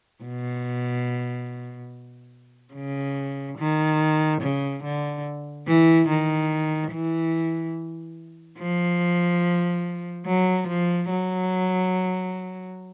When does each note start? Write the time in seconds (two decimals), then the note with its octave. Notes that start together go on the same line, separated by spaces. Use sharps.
0.24 B2
2.74 C#3
3.59 D#3
4.41 C#3
4.84 D3
5.67 E3
6.09 D#3
6.93 E3
8.59 F3
10.26 F#3
10.68 F3
11.10 F#3